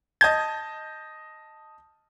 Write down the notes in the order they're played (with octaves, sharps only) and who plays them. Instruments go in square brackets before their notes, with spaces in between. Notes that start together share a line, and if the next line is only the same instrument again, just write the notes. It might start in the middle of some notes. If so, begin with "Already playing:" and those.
[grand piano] D#5 A5 G6 [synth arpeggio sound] G#6